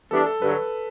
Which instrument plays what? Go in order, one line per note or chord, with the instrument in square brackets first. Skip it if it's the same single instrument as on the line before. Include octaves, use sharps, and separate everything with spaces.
[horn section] E3 G3 B3 D4 [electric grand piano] A4
[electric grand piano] A4
[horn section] G2 D3 F#3 [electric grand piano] B4